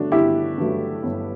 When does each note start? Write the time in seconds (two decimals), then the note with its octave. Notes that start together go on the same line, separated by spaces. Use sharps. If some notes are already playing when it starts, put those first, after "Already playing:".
Already playing: G1 G2 F#3 A3 D4 F#4
0.12 G1 E4 G4
0.58 G2 F#3 A3
1.03 G1